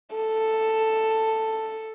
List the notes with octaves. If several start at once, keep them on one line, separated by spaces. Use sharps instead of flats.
A4